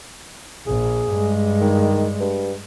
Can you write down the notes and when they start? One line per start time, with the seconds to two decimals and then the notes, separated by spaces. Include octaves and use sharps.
0.67 A#1 G#4
1.11 G2 G#3
1.61 D#3
2.20 G2